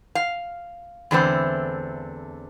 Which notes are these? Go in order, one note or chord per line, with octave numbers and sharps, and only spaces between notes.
F5
E2 D3 A3 C4